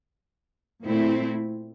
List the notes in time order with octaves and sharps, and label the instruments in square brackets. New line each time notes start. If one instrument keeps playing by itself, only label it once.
[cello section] A#2 A3 C4 E4